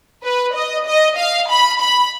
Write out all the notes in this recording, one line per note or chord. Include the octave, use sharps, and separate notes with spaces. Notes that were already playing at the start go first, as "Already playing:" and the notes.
B4
D#5
D#5
F5
B5
B5